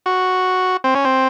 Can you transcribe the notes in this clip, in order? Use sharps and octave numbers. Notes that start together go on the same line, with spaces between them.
F#4
C4
C#4
C4